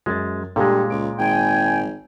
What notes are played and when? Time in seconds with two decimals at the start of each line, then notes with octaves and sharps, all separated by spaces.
0.06 F#2 G#3 G#6 A6
0.56 G2 A#2 G#3 G4 A4 F5
0.90 C#2 D7
1.19 G#1 G5 G#5